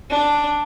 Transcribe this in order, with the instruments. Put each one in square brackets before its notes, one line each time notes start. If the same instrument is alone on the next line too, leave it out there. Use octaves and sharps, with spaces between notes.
[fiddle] D4